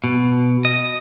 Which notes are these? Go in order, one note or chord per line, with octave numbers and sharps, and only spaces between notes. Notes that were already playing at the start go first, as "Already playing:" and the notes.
B2
D#5